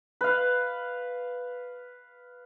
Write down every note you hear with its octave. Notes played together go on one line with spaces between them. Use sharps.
B4 F5